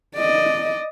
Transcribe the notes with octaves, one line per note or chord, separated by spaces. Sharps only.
D5 D#5